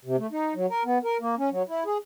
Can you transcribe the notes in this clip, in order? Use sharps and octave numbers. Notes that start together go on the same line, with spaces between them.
C3
A3
D#4
F#3
A#4
B3
A#4
A#3
C#4
F#3
E4
G#4